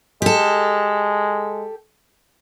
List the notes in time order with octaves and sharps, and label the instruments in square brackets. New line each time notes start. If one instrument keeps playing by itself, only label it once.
[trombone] G#3 [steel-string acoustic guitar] G4 A4